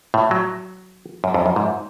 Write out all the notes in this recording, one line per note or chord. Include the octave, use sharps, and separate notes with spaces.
A2
F#3
F#2
F2
F#2
G#2